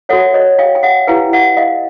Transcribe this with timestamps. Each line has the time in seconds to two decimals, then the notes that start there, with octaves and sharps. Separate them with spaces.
0.09 F#4 A4 C#5 E5 F#5
0.34 C#5 D#5
0.59 F5 G5
0.75 G5
0.83 E5 F#5
1.07 E4 G4 B4 F5 G5
1.33 E5 F#5
1.57 D#5 F5